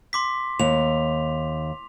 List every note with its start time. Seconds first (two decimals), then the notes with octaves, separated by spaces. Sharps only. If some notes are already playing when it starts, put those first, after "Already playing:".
0.13 C6 D6 B6
0.59 D#2 F7